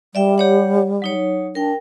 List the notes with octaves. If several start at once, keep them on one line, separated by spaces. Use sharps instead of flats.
G3 D5 E5 G5
G4 C#5 F#5
F#3 D#4 C#5
D4 A#4 G5